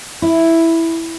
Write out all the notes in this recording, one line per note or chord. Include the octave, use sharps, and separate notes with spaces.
E4